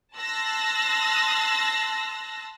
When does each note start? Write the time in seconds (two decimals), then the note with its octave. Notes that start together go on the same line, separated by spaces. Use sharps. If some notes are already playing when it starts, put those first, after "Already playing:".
0.16 A5 C6 E6 F#6 A6 A#6